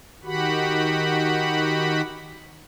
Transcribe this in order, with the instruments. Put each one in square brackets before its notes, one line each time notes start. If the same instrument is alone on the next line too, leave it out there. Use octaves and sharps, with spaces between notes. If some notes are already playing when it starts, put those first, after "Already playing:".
[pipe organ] D#3 F#4 G4 F#5 B5